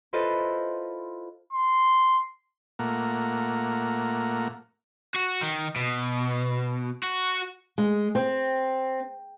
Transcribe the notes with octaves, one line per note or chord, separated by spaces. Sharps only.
E4 F4 A4 B4 C5 D#5
C6
A#2 A3 A#3 F#5 A#5
F#4
D#3
B2
F#4
G#3
C4